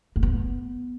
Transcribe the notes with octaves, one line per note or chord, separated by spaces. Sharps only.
A#3
B3